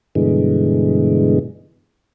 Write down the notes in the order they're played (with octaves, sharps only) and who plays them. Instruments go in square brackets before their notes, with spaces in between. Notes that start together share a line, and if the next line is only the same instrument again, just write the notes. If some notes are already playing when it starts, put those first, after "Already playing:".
[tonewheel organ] G2 B2 D3 E3 G#3